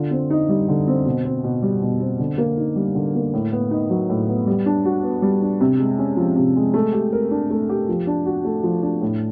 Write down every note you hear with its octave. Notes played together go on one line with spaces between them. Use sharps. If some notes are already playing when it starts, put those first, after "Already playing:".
Already playing: D3 F4
C4
D#4
G3
D3
C4
B2
C4
B2
G3
B2
C4
D3
A#3
D#4
G3
D3
A#3
A2
B3
D#4
F#3
A2
B3
G3
D4
F#4
B3
G3
D4
C3
G#3
C#4
F3
C3
G#3
A3
G4
A#4
D4
A3
G4
F3
D4
F#4
A3
F3
D4
A2